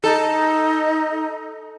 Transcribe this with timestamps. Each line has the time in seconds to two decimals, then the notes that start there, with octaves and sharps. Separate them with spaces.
0.04 D#4 A4